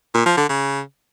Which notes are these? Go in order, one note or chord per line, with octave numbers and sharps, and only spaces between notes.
A#2
F3
D3
C#3